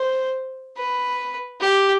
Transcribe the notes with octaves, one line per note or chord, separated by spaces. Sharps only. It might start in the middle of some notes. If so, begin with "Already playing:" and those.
Already playing: C5
B4
G4